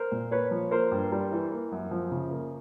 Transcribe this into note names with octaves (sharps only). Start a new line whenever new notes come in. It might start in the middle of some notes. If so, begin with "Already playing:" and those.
Already playing: A#4 C5
A#2
A#3 B4 C#5
F3
A#3 A#4 C5
G2
G3
E3
A#3
F#2
F3
C#3
A#3